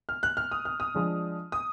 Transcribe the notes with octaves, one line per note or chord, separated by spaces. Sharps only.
F6
F#6
F6
D#6
F6
D#6
F3 G#3 D4
D#6